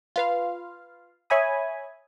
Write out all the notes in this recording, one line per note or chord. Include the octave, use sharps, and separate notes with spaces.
F4 B4 F5
C#5 E5 G#5 B5 D#6